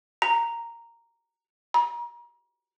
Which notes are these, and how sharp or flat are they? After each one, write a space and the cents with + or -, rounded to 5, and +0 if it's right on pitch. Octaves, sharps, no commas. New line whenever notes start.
A#5 -5
A#5 +35